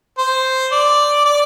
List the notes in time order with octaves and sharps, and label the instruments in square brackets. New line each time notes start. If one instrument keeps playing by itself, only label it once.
[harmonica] C5
D5
D5